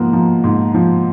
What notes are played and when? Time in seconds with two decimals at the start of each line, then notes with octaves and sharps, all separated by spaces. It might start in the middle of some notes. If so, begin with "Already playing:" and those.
Already playing: G#2 F3 A#3 B3
0.13 F3
0.44 G#2
0.74 F3